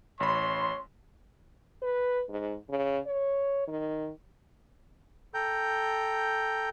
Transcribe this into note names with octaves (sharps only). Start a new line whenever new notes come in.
A1 C#5 B5 C6
B4
G#2
C#3
C#5
D#3
A4 G5 A#5 G6